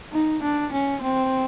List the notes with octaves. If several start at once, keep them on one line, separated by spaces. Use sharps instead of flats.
D#4
D4
C#4
C4